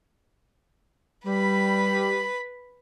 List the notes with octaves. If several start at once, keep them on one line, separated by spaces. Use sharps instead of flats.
G3 B4 B5